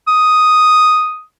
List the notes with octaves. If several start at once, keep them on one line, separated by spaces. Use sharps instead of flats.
D#6